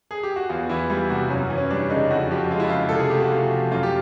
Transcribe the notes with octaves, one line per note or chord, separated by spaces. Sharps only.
G#4
G4
F#4
E2 F4
E3 E4
G3 F4
C3 F#4
F#2 C#4
E3
C#4
G3 D4
C#3 D#4
F2 F#4
F3 G4
G#3 F4
E4
C#3 F4
C3 A4
G#4
A3 G4
F#4
C3 F4
F3
F#2 F4
G4